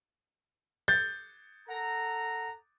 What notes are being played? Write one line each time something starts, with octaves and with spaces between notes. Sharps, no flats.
G6 A6
A4 F#5 A#5